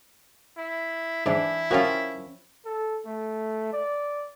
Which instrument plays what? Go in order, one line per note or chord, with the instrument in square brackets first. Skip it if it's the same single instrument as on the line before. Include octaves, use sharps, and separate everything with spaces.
[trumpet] E4
[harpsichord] G#2 [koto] E3 D4 [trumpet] E4
[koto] F3 C#4 F4 [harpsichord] F#4 F5 [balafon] A#4 C#5 G5
[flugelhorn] A4
A3
D5